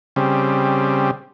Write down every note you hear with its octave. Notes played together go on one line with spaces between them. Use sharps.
C#3 G3 C4